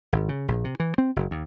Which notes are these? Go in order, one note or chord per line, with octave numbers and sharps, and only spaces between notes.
G#1
C#3
A#1
C3
E3
C4
F#1
D#2